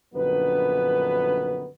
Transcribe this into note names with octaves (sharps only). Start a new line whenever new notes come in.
A#1 F#2 D3 D#3 B3 B4